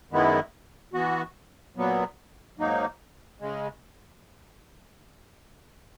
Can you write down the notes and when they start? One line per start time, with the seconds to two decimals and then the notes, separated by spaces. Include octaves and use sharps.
0.11 F#2 D#3 G#3 B3 E4
0.93 E3 B3 F#4
1.76 A#2 F#3 B3
2.57 G#2 F#3 A#3 D#4
3.41 C#3 G#3